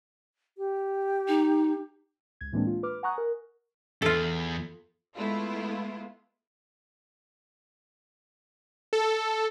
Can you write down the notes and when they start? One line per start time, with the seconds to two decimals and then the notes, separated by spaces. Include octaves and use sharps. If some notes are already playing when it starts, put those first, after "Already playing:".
0.58 G4
1.28 D#4
2.41 C#2 G#6
2.53 A2 E3 G#3 A#3 C4 D4
2.67 F4
2.83 B4 D6 F6
3.03 F#5 G#5 A#5 C#6 D#6 F#6
3.18 A#4
4.02 E2 F4 A4
5.16 G#3 A3 B3 E4 F4
8.93 A4